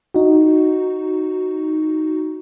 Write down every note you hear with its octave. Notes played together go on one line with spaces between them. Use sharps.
D#4 F#4